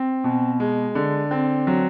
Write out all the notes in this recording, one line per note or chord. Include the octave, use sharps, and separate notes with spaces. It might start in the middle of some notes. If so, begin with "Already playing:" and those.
Already playing: C4
B2
G#3
D3
C4
F#3